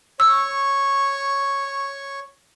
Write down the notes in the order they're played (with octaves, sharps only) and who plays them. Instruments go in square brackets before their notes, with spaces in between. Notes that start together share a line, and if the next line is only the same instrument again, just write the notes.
[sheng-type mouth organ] C#5 C#6 [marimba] E6